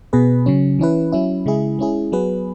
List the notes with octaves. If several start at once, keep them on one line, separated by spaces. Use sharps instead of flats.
B2 B3 G#4 B4
C#3 F#3 C#4
E3 C#4 E4 B4
F#3 C#4 E4
C#3 G#3 E4 G#4
G#3 C#4 E4 G#4
F#3 B3 G#4 B4